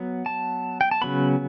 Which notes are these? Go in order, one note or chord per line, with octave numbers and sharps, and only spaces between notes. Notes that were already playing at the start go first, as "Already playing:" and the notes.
Already playing: F#3 B3
A5
G5
A5
C#3 F#3 B3 B5